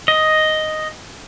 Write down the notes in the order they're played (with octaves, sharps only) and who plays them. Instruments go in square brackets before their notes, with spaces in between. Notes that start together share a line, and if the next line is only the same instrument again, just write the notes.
[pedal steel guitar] D#5